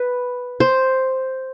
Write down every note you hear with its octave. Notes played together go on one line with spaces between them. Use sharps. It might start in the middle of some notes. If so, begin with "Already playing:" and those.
Already playing: B4
C5